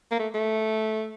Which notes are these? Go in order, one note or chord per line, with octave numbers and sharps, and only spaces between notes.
A#3
A3
A3